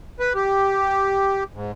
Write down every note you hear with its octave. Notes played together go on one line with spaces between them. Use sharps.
B4
G4
G#2